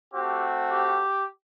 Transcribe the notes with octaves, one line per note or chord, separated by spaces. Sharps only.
A3 C4 F#4 G4
G4